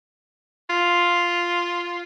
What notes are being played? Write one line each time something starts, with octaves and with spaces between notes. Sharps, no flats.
F4